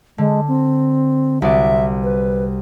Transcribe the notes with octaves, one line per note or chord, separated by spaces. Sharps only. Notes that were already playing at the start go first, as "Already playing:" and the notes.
D3 G#3
C4
C2 F#4 D5 E5
B4